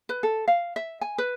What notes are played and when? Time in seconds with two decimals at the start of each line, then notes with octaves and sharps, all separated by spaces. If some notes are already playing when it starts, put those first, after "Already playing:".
0.09 B4
0.23 A4
0.48 F5
0.76 E5
1.01 G#5
1.18 B4